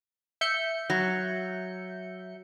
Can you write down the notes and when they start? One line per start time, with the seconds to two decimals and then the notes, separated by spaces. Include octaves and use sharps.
0.41 E5 G6 C#7
0.90 F#3